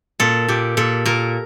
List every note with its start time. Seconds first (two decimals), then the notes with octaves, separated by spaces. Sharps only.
0.20 A#2 A4
0.48 A#2 G4
0.77 A#2 A4
1.05 A#2 A#4